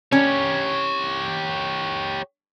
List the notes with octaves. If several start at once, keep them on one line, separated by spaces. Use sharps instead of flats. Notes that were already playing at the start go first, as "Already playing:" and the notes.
C#4 G4 C#5